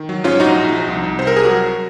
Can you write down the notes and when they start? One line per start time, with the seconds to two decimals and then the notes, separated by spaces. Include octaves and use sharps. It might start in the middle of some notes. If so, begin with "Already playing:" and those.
Already playing: D#3
0.09 F#3
0.24 G#2 C#4 F4
0.40 A#1 D#4 F#4
0.56 A#1
0.72 F3
0.87 C2
1.03 C2
1.19 C3 C5
1.27 A#4
1.36 C2 G#4
1.44 F#4 A#4
1.50 F#3